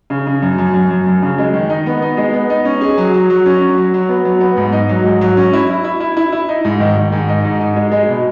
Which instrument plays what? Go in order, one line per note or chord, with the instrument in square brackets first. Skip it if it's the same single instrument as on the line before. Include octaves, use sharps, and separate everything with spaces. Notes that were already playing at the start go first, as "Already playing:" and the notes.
[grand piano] C#3
C#3
F#2
F#2
F#2
F#2
F#2
C#3
G#3
D#3
D#4
B3
D#4
G#3
B3
D#4
C#4
G#4
F#3
F#3
F#3
C#4
F#3
F#3
F#3
B3
F#3
B3
G#2
D#4
F#3
G#2
F#3
C#4
E4
E4
E4
E4
E4
E4
D#4
G#2
D#3
D#3
G#2
D#4
G#2
D#4
G#3
G#3
B2